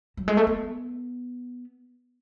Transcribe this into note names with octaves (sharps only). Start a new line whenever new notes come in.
F#3
G#3
A3
B3